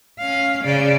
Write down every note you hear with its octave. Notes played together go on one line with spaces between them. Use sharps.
C#4 F5
C#3 D5